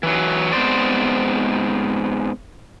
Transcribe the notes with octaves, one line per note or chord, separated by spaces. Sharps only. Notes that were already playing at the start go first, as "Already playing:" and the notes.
E3 F#3
G#2 B3 C4 C5 D5